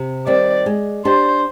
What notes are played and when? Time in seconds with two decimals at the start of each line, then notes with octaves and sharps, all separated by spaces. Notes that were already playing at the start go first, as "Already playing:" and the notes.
Already playing: C3
0.27 D#3 G3 C4 D5
0.66 G#3
1.05 D4 G4 C5 D5